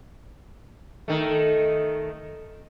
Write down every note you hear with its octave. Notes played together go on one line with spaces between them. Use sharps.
D#3 A3